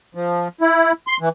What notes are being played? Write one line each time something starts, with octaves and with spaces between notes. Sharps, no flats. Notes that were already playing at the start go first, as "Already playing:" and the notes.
F3
E4
C6
E3